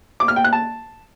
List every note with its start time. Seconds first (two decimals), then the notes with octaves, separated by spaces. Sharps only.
0.20 D6
0.28 F6
0.36 G5
0.44 F#6
0.53 A5